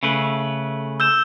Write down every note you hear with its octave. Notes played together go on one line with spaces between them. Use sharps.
C#3 A3 B4
E6 G6 E7